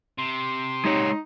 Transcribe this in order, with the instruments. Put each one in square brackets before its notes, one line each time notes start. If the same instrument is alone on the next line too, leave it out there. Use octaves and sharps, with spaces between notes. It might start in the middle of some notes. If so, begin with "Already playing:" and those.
[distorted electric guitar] C3 [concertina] C6
[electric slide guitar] G#3 G4 C#5 [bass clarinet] D#4